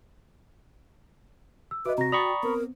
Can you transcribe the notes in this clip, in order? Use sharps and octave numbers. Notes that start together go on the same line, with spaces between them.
E6
F#4 B4 D#5 E5 D6
C3 C4 F#4 A#5 A#6
D5 G5 A#5 B5 C#6 D#6 A6
B3 C4 A#4